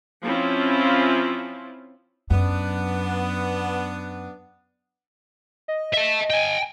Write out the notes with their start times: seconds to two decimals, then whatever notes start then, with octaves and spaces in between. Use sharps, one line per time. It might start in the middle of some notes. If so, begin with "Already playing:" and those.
0.23 F3 C4 C#4 E4 F4
2.30 F#2 B3 D4
5.68 D#5
5.94 E5 A5
6.30 G5 G#5